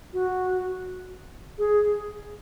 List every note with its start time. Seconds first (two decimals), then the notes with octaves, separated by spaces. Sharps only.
0.13 F#4
1.58 G#4